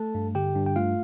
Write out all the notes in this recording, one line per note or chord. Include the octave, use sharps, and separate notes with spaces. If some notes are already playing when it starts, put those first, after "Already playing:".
Already playing: A3 A4 A5
G2
D3 G4 G5
G2
G5
A3 F4 F5